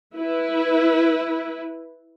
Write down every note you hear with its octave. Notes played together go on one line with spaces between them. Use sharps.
E4 B4